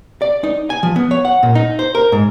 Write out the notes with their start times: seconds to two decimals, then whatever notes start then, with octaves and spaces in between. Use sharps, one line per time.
0.22 D5
0.44 D#4
0.70 G#5
0.83 F3
0.96 B3
1.11 C#5
1.25 F#5
1.43 A#2
1.55 D#4
1.79 C5
1.95 A#4
2.12 G#2